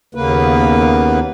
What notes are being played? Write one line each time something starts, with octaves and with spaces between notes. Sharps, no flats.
D#2 C#3 A#3 B3 B4